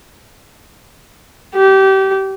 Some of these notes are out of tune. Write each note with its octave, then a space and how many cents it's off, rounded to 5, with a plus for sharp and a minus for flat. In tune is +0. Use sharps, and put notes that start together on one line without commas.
G4 -25